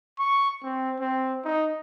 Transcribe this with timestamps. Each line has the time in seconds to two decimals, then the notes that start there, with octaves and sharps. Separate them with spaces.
0.19 C#6
0.63 C4
1.00 C4
1.45 D#4